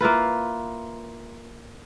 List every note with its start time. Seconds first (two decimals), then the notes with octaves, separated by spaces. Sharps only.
0.01 A#3 E4 F4 B4